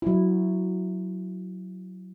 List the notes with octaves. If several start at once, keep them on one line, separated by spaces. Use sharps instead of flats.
F#3 E4